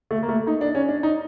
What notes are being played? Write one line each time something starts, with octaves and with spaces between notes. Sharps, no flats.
A3
A#3
A3
D#4
D4
C#4
D4
D#4